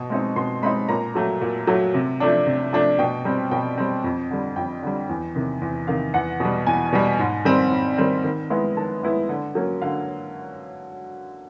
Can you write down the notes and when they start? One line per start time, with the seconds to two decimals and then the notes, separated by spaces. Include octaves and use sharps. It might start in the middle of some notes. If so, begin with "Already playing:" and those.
Already playing: B2
0.10 G#3 C4 D#4
0.36 B2 C6
0.62 G#3 C4 D#4 B5
0.89 A#2 A#5
1.15 F#3 A3
1.41 A#2
1.67 F#3 A3
1.94 C3
2.20 F3 A3 D4
2.47 C3
2.73 F3 A3 D4
2.99 B2 G5
3.25 G3 C4
3.51 B2 G5
3.78 G3 C4
4.04 F2
4.30 D3 G3
4.56 F2 G5
4.83 D3 G3
5.09 E2
5.36 C3 D#3
5.61 E2
5.87 C3 D#3 F5
6.14 E2 F#5
6.40 B2 G3
6.67 E2 G#5
6.93 B2 G3
7.19 G#2
7.45 D#3 G3 C4
7.72 G#2
7.98 D#3 G3 C4
8.24 D#3
8.50 G#3 B3 E4
8.77 D#3 A5
9.03 G#3 B3 E4
9.29 D3
9.55 F#3 A#3 C#4
9.82 D3 F5